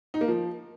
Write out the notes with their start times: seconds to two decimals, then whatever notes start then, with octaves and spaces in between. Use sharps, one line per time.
0.14 D#4
0.21 A#3
0.28 F3